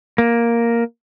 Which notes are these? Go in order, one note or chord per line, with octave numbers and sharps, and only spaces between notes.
A#3